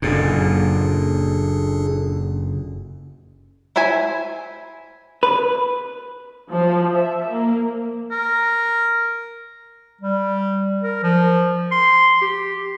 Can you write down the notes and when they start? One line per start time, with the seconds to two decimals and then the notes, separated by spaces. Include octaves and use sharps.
0.02 F#1 F#2 A#2 D4 G#4 A4
3.76 E4 C5 E5 G#5
5.23 B4
6.51 F3
6.94 E5
7.29 A#3
8.11 A#4
10.01 G3
10.82 A#4
11.03 F3
11.71 C6
12.22 G4